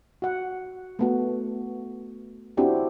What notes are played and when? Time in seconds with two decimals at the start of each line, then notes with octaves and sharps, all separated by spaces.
0.22 F#4 F#5
0.99 A3 B3 F#4
2.57 C4 D4 E4 F#4 G4